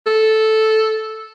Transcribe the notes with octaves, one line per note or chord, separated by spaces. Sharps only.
A4